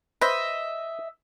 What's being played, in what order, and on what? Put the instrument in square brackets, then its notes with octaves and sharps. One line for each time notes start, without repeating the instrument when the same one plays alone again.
[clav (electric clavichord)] B4 C5 [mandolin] D#5 E5